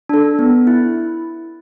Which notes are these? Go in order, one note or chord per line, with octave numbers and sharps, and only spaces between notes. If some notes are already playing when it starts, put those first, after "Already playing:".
D4 A4
B3
E4